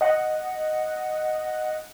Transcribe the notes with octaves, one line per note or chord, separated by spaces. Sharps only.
D#5 F#5